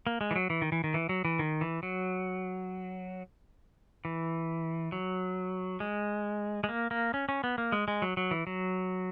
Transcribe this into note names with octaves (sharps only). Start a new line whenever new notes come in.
A#3
G#3
E3
F#3
E3
D#3
E3
D#3
E3
F#3
E3
D#3
E3
F#3
E3
F#3
G#3
G#3
A#3
A#3
C#4
C#4
B3
A#3
G#3
G#3
F#3
F#3
E3
F#3